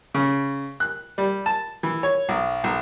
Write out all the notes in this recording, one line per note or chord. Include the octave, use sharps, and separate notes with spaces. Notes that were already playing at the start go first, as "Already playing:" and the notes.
C#3
F#6
G3
A5
E3
C#5
B1
B1